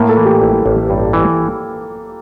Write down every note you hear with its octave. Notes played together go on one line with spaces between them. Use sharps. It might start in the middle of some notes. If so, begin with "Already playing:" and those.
Already playing: A2 A#3
A4
E3
G4
A1
A1
G2
E3